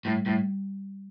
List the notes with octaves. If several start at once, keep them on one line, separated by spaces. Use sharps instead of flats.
A2 G3
A2 G3